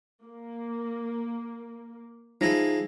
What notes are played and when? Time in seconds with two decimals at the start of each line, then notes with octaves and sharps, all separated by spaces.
0.24 A#3
2.41 F3 G#3 D#4 E4 A#6